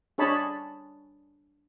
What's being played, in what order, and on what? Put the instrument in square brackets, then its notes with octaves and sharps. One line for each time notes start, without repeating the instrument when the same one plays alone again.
[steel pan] D4 G#4 C#5 D#5 A5 B5